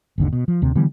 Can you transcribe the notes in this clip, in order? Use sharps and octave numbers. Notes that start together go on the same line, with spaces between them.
G1 D#2 D3
B2
F3
D2 C3
D3 E3 G3 B3